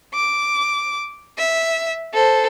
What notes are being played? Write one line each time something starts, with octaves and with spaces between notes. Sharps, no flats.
D6
E5
A4 C5